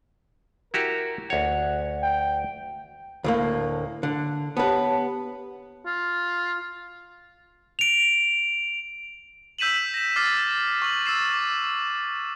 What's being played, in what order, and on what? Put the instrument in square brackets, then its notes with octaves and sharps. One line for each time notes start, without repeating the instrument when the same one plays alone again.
[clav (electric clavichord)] E4 F#4 G4 [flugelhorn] A#4
[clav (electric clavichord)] D2 C#5 [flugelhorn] F#5
[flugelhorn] G5
[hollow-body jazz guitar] D2 A2 A#3
D3
[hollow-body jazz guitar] B3 B4 [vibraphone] G4 C#5 A5
[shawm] F4
[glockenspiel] D7 F7
[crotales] E6 G6 B6 D#7 E7 F#7
A#6 E7
D6 F6 A6 C7
C#6 F#7
E6 A6 C7 E7
D6